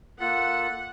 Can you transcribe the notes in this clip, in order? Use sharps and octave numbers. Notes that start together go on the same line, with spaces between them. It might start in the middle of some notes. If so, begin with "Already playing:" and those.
A#3 F4 A4 F#5